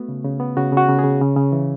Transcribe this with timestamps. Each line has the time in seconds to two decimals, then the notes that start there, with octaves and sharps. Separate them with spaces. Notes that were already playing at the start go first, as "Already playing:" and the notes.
Already playing: A3 B3 F#4
0.09 C#3
0.24 C#3
0.40 B3
0.57 C#3 F#4
0.72 C#3 F#4
0.89 C#3
0.99 G#4
1.04 C#3
1.21 C#3
1.37 C#3
1.52 E3